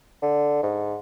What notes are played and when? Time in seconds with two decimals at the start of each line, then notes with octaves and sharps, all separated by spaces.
0.23 D3
0.63 G#2